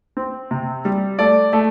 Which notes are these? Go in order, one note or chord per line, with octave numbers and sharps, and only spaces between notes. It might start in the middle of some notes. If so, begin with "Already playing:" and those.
C4
C3
G3
A3 D5
A3